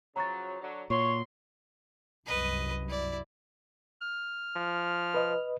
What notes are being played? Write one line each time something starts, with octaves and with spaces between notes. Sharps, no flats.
C#3 F3 F#3 A#5 C#6 A6
D3 F#3
A#2 F#3 C#5 C6
C2 F#2 B4 D#5
E4 D5
F6
F3
B4 D#5